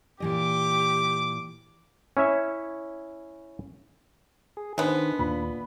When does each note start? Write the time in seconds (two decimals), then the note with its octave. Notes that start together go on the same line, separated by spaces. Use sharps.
0.20 A#2 E3 G4 D#5 D6
2.17 C#4 E4 C#5 E5
4.57 G#4
4.78 D#3 G#3 B3 D4 D#4 C5
5.19 D#2 A#2 B5